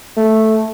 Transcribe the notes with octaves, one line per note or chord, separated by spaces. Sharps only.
A3